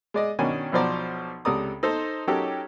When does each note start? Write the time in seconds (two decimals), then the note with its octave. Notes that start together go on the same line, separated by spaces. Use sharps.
0.14 G#3 D5 D#5
0.39 B2 D#3 C#4 D4 G#5
0.72 B1 B2 F3 C5 D5 A#5
1.45 C#2 C3 A4 D5 A#5 D#6
1.83 D#4 A4 C5
2.27 F#3 C#4 D#4 G4 A4 A#4